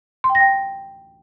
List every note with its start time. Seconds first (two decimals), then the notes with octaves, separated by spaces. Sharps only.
0.24 C6
0.30 G5
0.35 A#6
0.40 G5